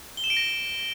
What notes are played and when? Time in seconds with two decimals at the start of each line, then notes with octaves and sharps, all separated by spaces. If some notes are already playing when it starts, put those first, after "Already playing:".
0.17 G7
0.24 E7
0.30 D7
0.37 A#6